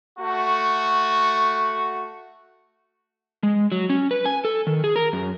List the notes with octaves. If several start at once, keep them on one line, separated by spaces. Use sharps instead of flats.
A3 F#4
G#3
F#3
C#4
B4
G#5
A4
D#3
G#4
A#4
F#2